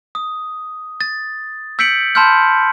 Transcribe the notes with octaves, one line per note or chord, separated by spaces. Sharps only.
D#6
A6
E6 G6 B6 C#7 D7 F#7
A5 B5 C6 E6 F6 G6